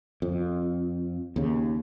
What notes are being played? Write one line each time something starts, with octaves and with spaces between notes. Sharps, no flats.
F2
D#2 C#3